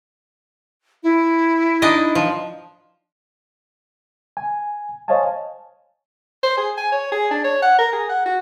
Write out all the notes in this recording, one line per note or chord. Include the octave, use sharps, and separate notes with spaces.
E4
D4 D#4 D#5
F3
G#5
C5 C#5 D#5 F5 G#5 A5
C5
G#4
G#5
C#5
G#4
D4
C#5
F#5
A#4
G#4
F#5
F#4